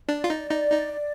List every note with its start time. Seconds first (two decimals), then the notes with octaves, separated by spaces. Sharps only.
0.09 D4 D5
0.24 F4
0.30 D#4
0.50 D#4
0.72 D#4